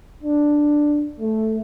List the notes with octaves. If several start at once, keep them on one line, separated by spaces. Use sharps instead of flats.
D4
A3